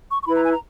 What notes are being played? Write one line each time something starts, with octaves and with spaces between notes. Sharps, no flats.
C#6
C#6
E4 B4 B5
A#5
G#5
A#5